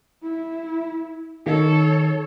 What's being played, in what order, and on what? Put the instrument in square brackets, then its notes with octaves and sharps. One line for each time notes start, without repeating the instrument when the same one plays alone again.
[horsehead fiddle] E4
[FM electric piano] D#3 [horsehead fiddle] A4 C#5